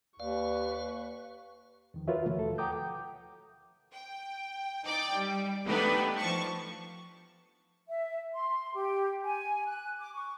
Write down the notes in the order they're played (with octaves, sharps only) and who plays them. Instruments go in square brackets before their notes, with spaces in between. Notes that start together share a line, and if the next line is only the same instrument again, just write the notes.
[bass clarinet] D#2 [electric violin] B4 C#6 [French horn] D5 [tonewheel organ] F5
[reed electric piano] E2 D#3 F3
F4 F#4 A#4 B4 C#5 E5
B2 D3 F3 A3
D#2 A4
F#5 G5 A#5 D6 D#6 G6
[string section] G5
D#4 D5 G5 D6
G3
A3 B3 D4 D#4 G4 B4
F3 A5 C#6
[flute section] E5
C6
G4
G#5
F#6
D6
C#6